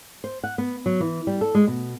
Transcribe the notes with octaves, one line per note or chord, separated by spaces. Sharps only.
C5
F#5
B3
F#3
E3
G3
A4
G#3
B2